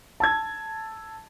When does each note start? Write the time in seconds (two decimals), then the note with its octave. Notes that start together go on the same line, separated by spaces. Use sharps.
0.20 A5 E6 G#6